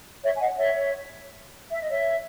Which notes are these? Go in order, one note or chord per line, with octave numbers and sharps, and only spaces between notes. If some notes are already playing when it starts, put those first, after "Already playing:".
C#5 E5
G#5
D#5 F#5
C#5 E5
E5
D#5
C#5 E5